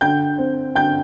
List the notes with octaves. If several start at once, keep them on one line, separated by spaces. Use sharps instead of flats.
D3 G5 G6
C4
D3 G5 G6